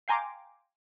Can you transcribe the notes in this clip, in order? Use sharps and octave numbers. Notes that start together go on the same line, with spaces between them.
F5 G5 G#5 A#5 C6 D6